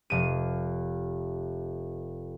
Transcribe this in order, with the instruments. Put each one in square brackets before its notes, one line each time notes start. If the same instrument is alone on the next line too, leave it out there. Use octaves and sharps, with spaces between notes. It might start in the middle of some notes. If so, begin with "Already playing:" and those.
[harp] F1 D#7